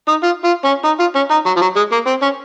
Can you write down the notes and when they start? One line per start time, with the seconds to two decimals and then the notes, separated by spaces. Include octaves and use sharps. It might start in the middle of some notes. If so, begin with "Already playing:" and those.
0.08 D#4
0.23 F4
0.44 F4
0.65 C#4
0.85 D#4
1.00 F4
1.15 C#4
1.31 D#4
1.46 F#3
1.56 F3
1.61 F#3
1.76 G#3
1.92 A#3
2.07 C4
2.22 C#4